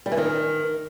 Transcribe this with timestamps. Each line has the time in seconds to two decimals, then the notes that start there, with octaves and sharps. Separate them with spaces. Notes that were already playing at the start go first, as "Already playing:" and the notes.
0.06 G3
0.12 E3
0.17 D#3